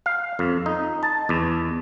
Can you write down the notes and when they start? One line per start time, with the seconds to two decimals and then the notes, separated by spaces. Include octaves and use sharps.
0.06 F5
0.39 F2
0.66 D#4
1.03 A5
1.29 E2